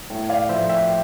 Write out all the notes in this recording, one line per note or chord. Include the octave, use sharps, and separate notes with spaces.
A2
D5 F5
F3 A3 C5 E5
E5 G5